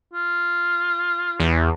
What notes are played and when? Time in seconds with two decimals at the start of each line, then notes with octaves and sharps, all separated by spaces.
0.13 F4
1.39 E2